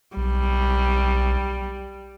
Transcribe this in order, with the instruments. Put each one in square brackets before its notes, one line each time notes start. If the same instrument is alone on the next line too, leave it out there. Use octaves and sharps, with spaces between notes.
[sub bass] B1 [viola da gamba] G3